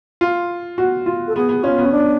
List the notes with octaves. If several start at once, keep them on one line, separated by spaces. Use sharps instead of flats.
F4
F#4
F4
A4
B3 G#4
B3
C#4 F4
B3
C#4
D4